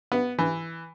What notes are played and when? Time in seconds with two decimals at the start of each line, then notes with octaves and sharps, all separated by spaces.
0.12 B3
0.39 E3